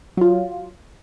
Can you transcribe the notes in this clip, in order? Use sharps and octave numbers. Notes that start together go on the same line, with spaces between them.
F#3 F4